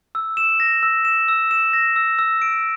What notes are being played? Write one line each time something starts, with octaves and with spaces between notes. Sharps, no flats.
E6
E7
A#6
E6
E7
E6
E7
A#6
E6
E6
D7